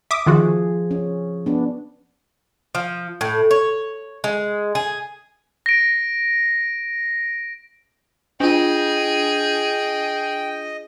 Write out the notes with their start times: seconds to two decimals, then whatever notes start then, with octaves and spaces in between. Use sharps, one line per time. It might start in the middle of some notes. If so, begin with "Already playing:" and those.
0.11 E5 D6 D#6
0.26 D#3 F3 F4 F#4 G#4
0.91 C#4
1.46 B3 D4
2.75 F3
3.21 A2
3.51 C#5
4.24 G#3
4.75 G#4
5.66 A#6 D7
8.40 D4 F4 G#4 D#5 G5